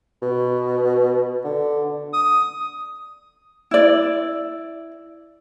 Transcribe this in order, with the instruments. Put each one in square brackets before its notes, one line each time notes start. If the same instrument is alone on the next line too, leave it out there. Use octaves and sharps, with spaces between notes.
[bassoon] B2
D3
[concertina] D#6
[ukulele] E4 D5